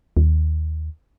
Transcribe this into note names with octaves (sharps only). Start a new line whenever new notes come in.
D#2